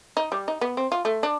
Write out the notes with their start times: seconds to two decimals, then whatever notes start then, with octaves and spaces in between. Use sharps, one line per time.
0.17 D#4
0.32 G3
0.48 D#4
0.61 B3
0.77 C4
0.92 F4
1.05 A3
1.23 D4